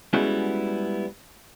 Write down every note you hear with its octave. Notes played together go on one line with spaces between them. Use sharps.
G3 G#3 B3 C#4 E4 F#4